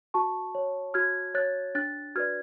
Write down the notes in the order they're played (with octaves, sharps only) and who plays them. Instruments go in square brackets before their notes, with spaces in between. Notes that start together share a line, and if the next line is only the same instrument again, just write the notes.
[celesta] F#4 A5 C#6
C#5
F#4 F6 G#6
C#5 F#6 A6
D4 F#6 A6
F#4 B4 D5 F6 G#6